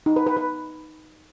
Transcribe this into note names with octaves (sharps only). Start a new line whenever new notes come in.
D#4
B4
B4
B4